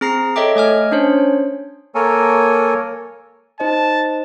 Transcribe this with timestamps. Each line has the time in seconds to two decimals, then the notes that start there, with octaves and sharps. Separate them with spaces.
0.01 C4 G#4 A#5 A#6 C7
0.36 A4 C#5 D#5 E5 G5 D6
0.56 A3 D#5 G#5 F6
0.92 C#4 D4 C5 C#5
1.95 A#3 A4 A#4 C#5 G#5
3.60 D#4 C5 D#5 A5